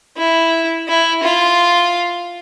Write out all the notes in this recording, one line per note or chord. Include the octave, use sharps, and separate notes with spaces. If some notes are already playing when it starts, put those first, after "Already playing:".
E4
E4
F4